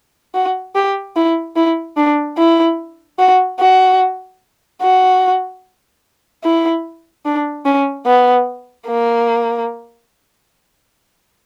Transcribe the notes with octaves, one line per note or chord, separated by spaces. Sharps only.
F#4
G4
E4
E4
D4
E4
F#4
F#4
F#4
E4
D4
C#4
B3
A#3